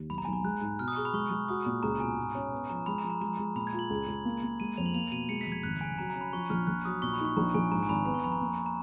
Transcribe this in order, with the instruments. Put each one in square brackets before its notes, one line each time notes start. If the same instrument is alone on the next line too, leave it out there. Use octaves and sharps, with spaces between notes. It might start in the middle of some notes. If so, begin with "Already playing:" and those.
Already playing: [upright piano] D#2
[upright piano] B1 [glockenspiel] B5
[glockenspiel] A#5
G#5
[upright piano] B1
[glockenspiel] A#5
[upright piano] G#3 [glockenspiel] F#6
[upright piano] G#2
[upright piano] B2 [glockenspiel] F6
[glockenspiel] D#6
[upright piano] G#4 [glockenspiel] C#6
[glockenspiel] B5
[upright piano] G#3 [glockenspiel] C#6
[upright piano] G#3
[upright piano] F#4 [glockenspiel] D#6
[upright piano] A#2
[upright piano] C#2 [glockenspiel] A#5
[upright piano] B2 [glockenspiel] G#5
[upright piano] G#2
C#4
B3
[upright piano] F3 [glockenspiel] A#5
[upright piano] G#3 [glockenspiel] B5
[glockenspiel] A#5
[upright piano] F3
[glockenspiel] A#5
[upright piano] G#3 [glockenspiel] A#5
[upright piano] G#3
[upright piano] A#2 [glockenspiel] B5
[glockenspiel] G#6
[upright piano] F4
[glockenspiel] F#7
[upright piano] C#2
C#2
A#3
A#3
[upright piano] G#3 [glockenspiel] D#7
[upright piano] F2 [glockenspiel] F7
[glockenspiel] F#7
[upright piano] A#3 [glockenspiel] F7
[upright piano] B2 [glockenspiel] D#7
[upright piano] G#3 [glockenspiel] C#7
[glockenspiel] B6
[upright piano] F1
[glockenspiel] G#6
[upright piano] G#1 [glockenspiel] F#6
[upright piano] C#3 [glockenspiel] G#5
[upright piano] F#3 [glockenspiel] A#5
[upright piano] C#4 [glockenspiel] A#5
[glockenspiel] B5
[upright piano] F3 [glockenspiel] C#6
[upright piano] A#1 [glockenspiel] F6
[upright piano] A#1 [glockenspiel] F#6
[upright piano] F#3 [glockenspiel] D#6
[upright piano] A#2 [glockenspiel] C#6
[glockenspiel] B5
[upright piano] D#4
[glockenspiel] C#6
[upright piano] A#1 [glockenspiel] A#5
[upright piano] A#1 [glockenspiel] G#5
[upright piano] G#2 [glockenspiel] A#5
[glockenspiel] G#5
[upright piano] G#1 [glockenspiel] B5
[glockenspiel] A#5
[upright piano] B3 [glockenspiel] B5
[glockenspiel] C#6
[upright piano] F2 [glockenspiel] B5
[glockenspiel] A#5
[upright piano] A#3
[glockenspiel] A#5